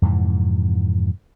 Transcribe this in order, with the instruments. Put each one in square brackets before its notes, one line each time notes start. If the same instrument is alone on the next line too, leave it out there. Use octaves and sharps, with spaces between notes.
[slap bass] F2 G#2 C3 E3